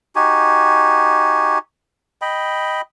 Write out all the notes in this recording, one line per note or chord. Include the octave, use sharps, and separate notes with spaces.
D#4 F#4 G4 G#5
D#5 G5 B5